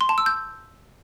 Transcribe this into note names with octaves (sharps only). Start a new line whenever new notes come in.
C6
A5
E6
G6